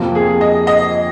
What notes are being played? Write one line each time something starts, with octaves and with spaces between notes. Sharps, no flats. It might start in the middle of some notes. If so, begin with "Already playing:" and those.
Already playing: F2 C3 F3 A#3
G#4
D#5
D#5